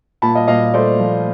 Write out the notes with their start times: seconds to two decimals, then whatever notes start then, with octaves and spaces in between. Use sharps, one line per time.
0.22 A#2 A5 B5
0.35 D#5 F5
0.48 A#2 D#5 F5
0.74 A3 C5 D5
0.99 F3